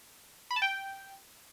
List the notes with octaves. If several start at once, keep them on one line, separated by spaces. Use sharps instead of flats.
B5
A5
G5